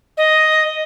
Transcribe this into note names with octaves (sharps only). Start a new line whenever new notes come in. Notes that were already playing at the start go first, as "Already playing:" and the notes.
D#5